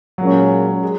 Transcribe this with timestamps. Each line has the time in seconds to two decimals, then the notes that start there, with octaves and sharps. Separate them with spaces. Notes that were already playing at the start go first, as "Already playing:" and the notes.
0.18 A#2 F#3 G#3 C#4
0.83 G#3